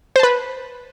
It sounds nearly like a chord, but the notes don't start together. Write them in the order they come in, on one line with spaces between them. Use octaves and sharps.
C5 A5 B4